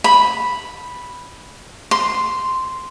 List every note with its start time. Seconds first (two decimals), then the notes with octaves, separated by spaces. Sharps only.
0.04 B5
1.91 C6